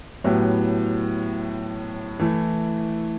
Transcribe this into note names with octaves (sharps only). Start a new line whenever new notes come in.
A2 F#3 B3 E4 G4
E3 A3 E4